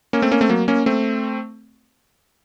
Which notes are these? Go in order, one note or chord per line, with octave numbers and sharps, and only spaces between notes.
A#3 C#4
A3 C4
A#3 C#4
A3 C4
F#3 A#3
A#3 C#4
A3 C4